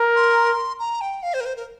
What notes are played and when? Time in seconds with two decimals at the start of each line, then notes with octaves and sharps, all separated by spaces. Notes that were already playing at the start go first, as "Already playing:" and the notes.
Already playing: A#4
0.16 C6
0.79 A#5
1.01 G5
1.23 F5
1.34 C5
1.40 A#4
1.45 C5
1.56 A#4